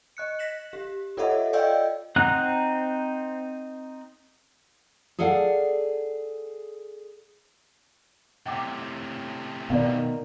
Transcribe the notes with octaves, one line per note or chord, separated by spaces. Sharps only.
D#5 F#6 C#7
A#6 B6 E7 F#7
G4
F4 A4 C#5 D#5 E5 F#5
D5 D#5 F5 G5 E6 G6
C4 D#4 F#5 A#5 F#6
G#4 A4 D5 F5 F#5
A2 C3 F#5 G5 D6
B2 D#3 B3 D5 F5